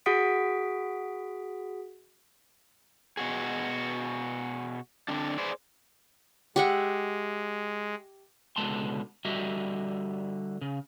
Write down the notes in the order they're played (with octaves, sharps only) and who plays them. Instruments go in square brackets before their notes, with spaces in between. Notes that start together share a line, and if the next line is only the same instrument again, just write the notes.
[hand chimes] F#4 G#4 F#5 D#6 B6 D7
[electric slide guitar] B2 F#4 G#4
D3 C4 D4
G#4 B4 C5 D5
[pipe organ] G#3 [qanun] G4 E5 F#5
[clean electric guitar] C#2 B2 D3 G#3 A5 C6
D3 G3 F#4 G4 D#5 E5
C#3